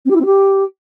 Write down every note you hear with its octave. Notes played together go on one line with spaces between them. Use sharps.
C4
G4
E4
C4
G4